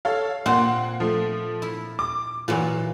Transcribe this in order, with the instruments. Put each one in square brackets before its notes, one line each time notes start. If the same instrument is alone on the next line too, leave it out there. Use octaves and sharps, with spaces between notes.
[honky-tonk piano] A4 C#5 F5
[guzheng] A#2 C4 C5 [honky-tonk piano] A#3 F#5
[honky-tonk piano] F3 A3
[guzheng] E4
[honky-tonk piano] D6
[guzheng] A#2 E3 F#3 [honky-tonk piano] F4